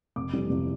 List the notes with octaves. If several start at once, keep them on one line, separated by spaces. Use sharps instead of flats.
F1 D6
F2 E3 G3
F1